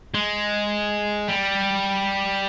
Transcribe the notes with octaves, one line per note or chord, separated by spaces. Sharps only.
G#3
G3